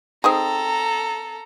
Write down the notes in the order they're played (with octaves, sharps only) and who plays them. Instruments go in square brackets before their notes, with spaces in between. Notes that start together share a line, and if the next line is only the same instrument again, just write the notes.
[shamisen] C4 D#4 G#4 [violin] A4 A#5